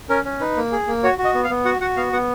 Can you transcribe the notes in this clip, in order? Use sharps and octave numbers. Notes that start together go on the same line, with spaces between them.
C#4 A#4
C#4
D#4 B4
A#3
G#4
A#3
F#4 C#5
F#4
D#5
B3
F5
B3
F#4 F#5
F#4 F#5
B3 F5
B3 F#5